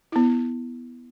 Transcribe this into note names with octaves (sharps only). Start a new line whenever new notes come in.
B3 E4